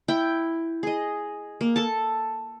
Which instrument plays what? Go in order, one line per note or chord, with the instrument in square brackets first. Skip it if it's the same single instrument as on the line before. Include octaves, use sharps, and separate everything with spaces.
[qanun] E4 G5
G#4 D#5
A#3
A4 A5